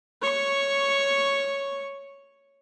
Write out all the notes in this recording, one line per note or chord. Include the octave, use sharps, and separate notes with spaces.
C#5 C#6